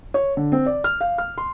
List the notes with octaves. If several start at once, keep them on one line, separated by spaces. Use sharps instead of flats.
C#5
D3
C4
D5
F6
F5
F6
C6